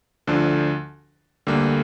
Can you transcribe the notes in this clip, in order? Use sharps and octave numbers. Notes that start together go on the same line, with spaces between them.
D2 D3 F3 D4
D2 D3 G3 A#3